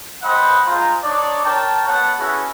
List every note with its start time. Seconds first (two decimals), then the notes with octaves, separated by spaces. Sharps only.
0.23 C5 D#5 F#5 G5 A5 B5
0.65 G#3 F4 C5 A#5
1.03 D4 D#4 C#5 D5
1.44 A#4 C#5 G5 A5
1.87 B3 C#5 F#5 A5
2.19 C#4 E4 F#4 G#4 A4 B4